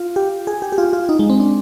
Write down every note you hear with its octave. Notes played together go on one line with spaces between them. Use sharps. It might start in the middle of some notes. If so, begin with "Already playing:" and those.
Already playing: F4
G4
G#4
G4
G4
F4
F4
D#4
G#3
C4
D4